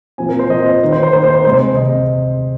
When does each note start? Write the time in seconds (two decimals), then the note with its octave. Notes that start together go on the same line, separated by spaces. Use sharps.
0.18 A#2 F3 C4 G#5
0.29 A#4
0.39 C5
0.50 A#2 F3 C4 D#5
0.66 C5
0.81 D#3 A#3
0.92 C5
1.03 C5
1.13 D#3 A#3 C5
1.24 C5
1.34 C5
1.45 C3 G#3 C4 C5
1.77 C3 G#3 C4 D#5